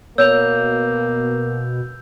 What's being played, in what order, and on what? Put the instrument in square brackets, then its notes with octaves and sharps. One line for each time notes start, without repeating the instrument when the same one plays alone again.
[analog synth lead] B2 [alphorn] A#3 [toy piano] C#5 [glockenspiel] E6 G6 F7